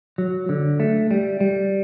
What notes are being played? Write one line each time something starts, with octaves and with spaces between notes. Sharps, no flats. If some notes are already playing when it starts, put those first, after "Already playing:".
F#3
D3
A3
G3
G3